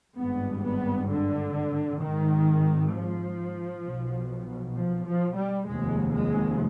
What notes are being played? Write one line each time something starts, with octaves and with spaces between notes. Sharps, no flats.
G#1 G2 B3
B3
D3
G#1 G#2 D#3
F3
B1 B2
F3
F3
G3
F1 D#2 G#3
G#3